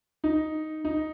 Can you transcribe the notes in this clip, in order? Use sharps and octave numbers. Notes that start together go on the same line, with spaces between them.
D#4
D#4